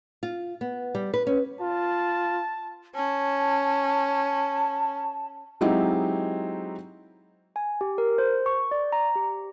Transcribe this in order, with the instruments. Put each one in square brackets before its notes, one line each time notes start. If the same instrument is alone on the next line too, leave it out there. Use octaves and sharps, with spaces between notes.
[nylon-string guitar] F4
B3
G3
B4
C#4
[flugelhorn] F4 [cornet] A5
[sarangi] C#4 [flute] A5
[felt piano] F#3 G#3 C4 D#4 E4 G4
[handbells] G#5
G4
A#4
C5
C#6
D5
A#5
G4